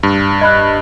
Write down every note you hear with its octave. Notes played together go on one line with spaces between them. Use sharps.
G2
D#5 B5 F#6